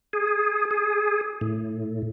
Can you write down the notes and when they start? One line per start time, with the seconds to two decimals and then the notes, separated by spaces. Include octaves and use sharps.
0.13 G#4
0.71 G#4
1.41 A2